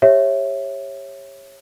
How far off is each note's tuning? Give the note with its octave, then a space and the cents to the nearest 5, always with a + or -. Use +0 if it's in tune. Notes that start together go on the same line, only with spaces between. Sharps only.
G4 +15 C#5 -20 E5 +0